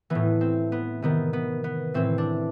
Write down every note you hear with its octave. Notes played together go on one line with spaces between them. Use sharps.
A2 E3 B3
C4
B3
C3 D#3 B3
B3
B3
A2 E3 C4
D4